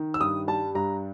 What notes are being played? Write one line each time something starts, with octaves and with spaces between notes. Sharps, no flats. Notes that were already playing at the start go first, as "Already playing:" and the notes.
Already playing: D#3
E6
G2 D#6
G3 A5
G2 A#5